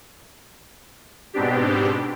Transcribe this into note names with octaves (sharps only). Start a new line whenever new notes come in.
G#2 B2 B3 C4 D4 G4